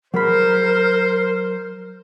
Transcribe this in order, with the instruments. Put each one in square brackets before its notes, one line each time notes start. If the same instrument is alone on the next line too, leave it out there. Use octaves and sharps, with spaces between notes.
[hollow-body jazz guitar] F#3 G#4 B5 [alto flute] A#4 [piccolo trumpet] C5